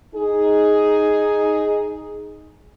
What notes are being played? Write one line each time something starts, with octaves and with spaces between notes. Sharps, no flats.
D#4 G#4